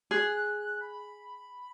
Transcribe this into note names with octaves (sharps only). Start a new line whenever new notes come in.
G#4 F#6
B5